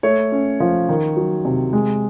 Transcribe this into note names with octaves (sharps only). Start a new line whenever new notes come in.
A3 C#5
C#4
F3
D#3
F#3
C3
G#3